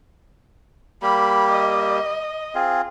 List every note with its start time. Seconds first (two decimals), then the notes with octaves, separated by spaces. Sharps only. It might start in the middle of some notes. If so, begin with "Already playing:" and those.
1.02 G3 A#3 G4 B5
1.51 D#5
2.55 C4 F4 G#4